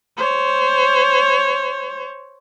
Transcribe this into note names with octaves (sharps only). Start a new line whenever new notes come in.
C5 C#5